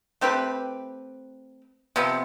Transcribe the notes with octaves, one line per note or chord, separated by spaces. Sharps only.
A3 C4 G4 B4
C3 F3 B3